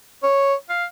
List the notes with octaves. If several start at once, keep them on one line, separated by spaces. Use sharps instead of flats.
C#5
F5